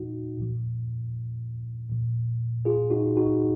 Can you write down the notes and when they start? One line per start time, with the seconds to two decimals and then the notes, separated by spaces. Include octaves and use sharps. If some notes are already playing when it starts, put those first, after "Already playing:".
Already playing: A#2 F3 D#4 F#4
0.38 A#2 F3
1.90 A#2 F3
2.65 F4 G#4
2.90 D#4 F#4
3.17 D#4 F#4